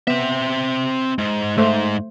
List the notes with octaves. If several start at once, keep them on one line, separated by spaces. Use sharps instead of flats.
B3 C4 E5
G#2
G#2 A3 C5